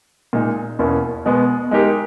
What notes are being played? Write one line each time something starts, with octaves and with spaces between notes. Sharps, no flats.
A#2 G#3 D#4
E2 B2 A#3 C#4 E4
B2 G#3 B3
G#3 D#4 G4 A#4